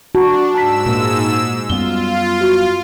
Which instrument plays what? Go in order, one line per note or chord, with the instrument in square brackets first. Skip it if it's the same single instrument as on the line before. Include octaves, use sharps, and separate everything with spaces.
[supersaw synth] D4 [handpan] F#4 [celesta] A5 A#5
[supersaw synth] G#2 E6 [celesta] A5 A#5 B6
[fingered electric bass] A#2 A#3
[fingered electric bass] F#2 G3 B3 [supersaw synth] F4 [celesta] G7
[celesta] F#4